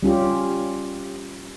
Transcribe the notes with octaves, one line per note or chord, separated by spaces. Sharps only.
G3 C#4 F4 G4